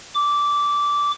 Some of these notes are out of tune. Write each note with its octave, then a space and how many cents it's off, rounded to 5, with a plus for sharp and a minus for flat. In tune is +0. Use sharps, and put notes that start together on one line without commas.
D6 -15